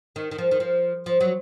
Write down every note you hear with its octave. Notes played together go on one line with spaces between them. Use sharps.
D#3
D#3
F3
D#3
F3
F3
F#3